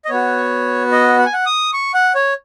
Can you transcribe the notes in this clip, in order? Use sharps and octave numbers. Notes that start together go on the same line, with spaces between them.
D#5
B3 F#4 C#5
D#5
F#5
G#5
F#5
D#6
C#6
F#5
C#5